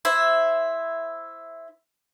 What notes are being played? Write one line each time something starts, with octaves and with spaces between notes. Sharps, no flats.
E4 C5 E5